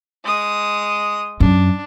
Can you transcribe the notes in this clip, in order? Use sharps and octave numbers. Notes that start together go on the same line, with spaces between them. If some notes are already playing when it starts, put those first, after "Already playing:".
G#3 D#6
F#2 D4